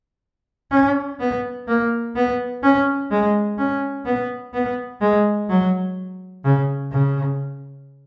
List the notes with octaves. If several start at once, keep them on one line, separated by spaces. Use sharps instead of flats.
C#4
B3
A#3
B3
C#4
G#3
C#4
B3
B3
G#3
F#3
C#3
C#3